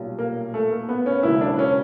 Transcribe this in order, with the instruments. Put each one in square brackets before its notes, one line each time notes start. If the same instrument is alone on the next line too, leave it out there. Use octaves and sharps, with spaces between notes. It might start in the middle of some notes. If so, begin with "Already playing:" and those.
Already playing: [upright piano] B1 A#2 G3
A#3
A3
A#3
B3
C#4
E1 D#2 C#3 F#3 E4
D4
C#4